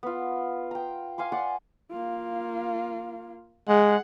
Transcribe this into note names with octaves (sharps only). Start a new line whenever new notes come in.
B3 F4
G5 A#5
F5 G#5 C6 D6
D5 F#5 C6 D6
A#3 F4
G#3 G#4 F#5